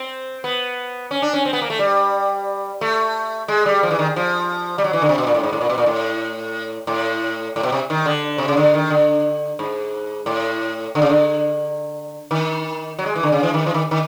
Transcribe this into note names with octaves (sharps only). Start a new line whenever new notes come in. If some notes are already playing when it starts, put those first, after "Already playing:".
Already playing: C4
B3
C#4
D4
C#4
C4
B3
A#3
A3
G3
A3
G#3
G3
F3
E3
D#3
F3
G3
F#3
E3
D3
C3
B2
A#2
A2
G#2
A2
A#2
B2
A#2
A2
A2
A2
B2
C3
D#3
D3
C3
C#3
D3
D#3
D3
G#2
A2
D3
C#3
D3
D#3
F#3
G#3
E3
D3
C#3
E3
D#3
E3
D#3
D#3